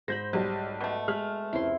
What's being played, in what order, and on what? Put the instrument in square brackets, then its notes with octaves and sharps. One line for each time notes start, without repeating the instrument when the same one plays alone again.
[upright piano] G#2 [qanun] C5 B5 [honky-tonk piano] G6 A#6
[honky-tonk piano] B1 G3
[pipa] B2 A3
[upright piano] G#3 [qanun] B4 [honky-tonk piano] F6
[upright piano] F1 C#2 C4 [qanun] E4 C6